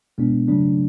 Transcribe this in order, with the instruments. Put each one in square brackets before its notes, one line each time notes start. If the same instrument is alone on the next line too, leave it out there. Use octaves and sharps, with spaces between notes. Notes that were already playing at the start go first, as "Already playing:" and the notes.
[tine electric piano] B2 G#3 B3 D4
C#3 F#3 A3 D4